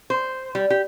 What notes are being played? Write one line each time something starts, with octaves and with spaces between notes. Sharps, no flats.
C5
G3
G4